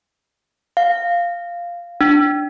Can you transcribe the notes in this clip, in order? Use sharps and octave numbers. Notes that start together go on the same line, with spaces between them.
F5
D4